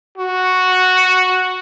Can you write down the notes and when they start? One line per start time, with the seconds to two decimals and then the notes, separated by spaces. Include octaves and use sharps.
0.18 F#4